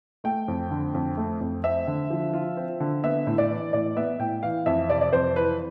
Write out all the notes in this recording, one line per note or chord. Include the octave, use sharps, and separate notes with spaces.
A3 G5
F2
D3
F2
A3
F2
C4 E5
D3
F3
F4
C4
D3
B3 E5
A2
D5
E3
A2 D5
B3 E5
A2 G5
E3 F5
F2 E5
C3 D5
D5
F2 C5
E3 B4